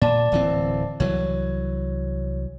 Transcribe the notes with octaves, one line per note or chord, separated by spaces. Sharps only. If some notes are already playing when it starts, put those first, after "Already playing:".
A#2 D5 A5
D1 E3 C4
C2 E3 F#3 C#5